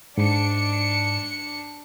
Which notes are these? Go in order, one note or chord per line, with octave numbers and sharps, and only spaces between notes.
G#2 D4 C#7